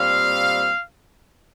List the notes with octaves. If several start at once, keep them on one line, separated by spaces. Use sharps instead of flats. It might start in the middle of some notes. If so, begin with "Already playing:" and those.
Already playing: A#2 G3 C4 F5